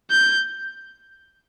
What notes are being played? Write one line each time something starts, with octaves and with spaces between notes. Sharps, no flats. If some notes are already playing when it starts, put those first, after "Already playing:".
G6